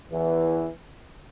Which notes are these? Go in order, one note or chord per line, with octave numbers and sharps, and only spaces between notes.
E2 E3